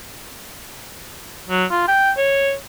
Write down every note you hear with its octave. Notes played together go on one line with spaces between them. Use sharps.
F#3
F4
G5
C#5